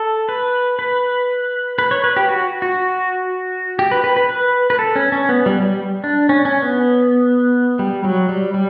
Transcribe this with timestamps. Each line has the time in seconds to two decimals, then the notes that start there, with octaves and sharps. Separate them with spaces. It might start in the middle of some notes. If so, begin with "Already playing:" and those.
Already playing: A4
0.29 B4
0.79 B4
1.79 B4
1.91 C#5
2.04 B4
2.16 G4
2.29 F#4
2.62 F#4
3.79 G4
3.91 B4
4.04 B4
4.17 B4
4.29 B4
4.70 B4
4.79 A4
4.96 C#4
5.12 C#4
5.29 B3
5.46 G3
5.62 G3
6.04 D4
6.29 C#4
6.45 C#4
6.62 B3
7.79 G3
8.04 F#3
8.29 G3
8.54 G3